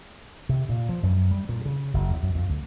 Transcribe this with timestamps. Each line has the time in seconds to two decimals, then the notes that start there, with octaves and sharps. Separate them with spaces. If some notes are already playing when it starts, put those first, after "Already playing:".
0.49 C3
0.69 A#2
0.89 F3
1.03 F#2
1.31 G3
1.49 A#2
1.66 C#3
1.94 F#1
2.10 E2
2.23 F#2
2.35 F2
2.50 D2